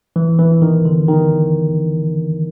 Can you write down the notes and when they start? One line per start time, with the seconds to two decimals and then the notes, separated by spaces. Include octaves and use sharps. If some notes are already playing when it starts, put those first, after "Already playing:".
0.16 E3
0.39 E3
0.62 D#3
0.85 D3
1.08 D#3